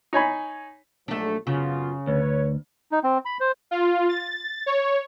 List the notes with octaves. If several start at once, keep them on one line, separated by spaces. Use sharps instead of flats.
D#4 C#5 G#5 B5
A#1 G#2 F#3 A3 D4
F#2 C#3 B3 F4
D2 B4 C#5
D#4
C4
B5
C5
F4
A6
C#5